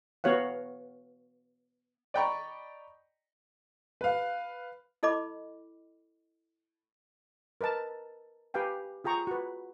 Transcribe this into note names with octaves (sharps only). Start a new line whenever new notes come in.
B3 F#4 C#5 F5 F#5
D5 D#5 G5 A#5 B5 C#6
B4 F5
E4 A4 D#5 B5 D6
A#4 B4 D#5 A5
G4 B4 F5 G5 G#5
F4 G#4 G5 A#5 C#6
F#4 B4